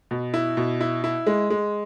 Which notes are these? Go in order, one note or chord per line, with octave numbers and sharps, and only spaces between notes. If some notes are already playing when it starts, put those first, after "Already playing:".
B2
E4
B2
E4
E4
G#3
G#3